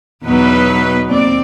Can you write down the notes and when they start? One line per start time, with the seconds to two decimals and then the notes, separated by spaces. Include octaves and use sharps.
0.24 E2 B2 F#3 B3 D#4 B4
1.10 D#2 C4 D5